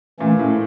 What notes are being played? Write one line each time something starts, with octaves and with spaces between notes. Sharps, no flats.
A#2 E3 A3 C#4
A2